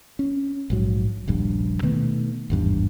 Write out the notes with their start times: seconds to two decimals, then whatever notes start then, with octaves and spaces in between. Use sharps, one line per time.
0.19 C#4
0.70 A#1 G#2 F#3
1.28 D#1 A#1 G2
1.83 B2 D#3 A3 B3
2.50 G#1 E2 G2